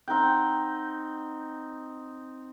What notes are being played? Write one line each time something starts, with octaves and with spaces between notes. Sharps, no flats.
C4 D#4 F#5 G5